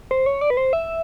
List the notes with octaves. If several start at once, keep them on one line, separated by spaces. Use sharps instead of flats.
C5
C#5
D5
B4
C5
E5